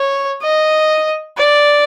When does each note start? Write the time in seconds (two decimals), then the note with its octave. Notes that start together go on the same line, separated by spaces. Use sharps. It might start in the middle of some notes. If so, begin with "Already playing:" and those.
Already playing: C#5
0.42 D#5
1.38 D5